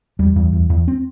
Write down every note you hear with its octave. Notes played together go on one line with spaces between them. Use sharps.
E2 G3
E2
E2
E2
C4